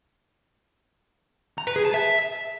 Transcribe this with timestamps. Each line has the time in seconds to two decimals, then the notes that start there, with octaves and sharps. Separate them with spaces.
1.58 A#5
1.67 B4
1.76 G#4
1.85 A5
1.94 E5